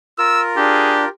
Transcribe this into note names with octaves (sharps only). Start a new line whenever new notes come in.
F4 A#4 E6
D4 G4 G#4